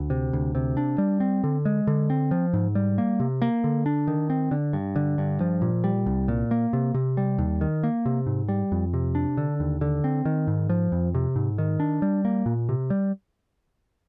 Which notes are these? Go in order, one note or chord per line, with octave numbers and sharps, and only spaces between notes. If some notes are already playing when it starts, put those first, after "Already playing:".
Already playing: D2
C3
D2
C3
D4
G3
C4
D3
G#3
D3
C4
F3
G#2
G3
A#3
C3
A#3
D3
D4
D#3
C4
D3
G2
D3
G2
F3
A#2
G3
C2
A#2
A#3
C3
C3
G3
D#2
D#3
A#3
C3
G#2
G3
F2
C3
D4
D3
D#2
D3
C4
D#3
G#2
F3
F2
C3
G#2
D#3
D4
G3
A#3
A#2
C3
G3